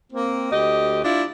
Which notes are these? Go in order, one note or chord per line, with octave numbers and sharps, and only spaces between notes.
A#3 C4
D2 G4 D#5
D4 E4 F4